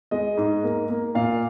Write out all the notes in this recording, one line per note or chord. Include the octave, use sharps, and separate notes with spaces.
G#3 D#5
G#2
A#3
A#3
A#2 F5